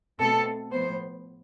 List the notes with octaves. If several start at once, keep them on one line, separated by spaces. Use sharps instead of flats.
B2 A3 C4 A4
A2 F3 B3 C5